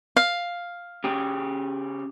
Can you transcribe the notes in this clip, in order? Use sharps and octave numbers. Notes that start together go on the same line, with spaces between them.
F5
C#3 G4 G#4